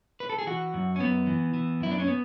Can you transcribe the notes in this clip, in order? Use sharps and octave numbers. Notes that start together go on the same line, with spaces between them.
B4
A4
G#4
E3 F#4
F#2
C#4
F#2 B3
E3
E3
F#2 E4
D4
C#4
B3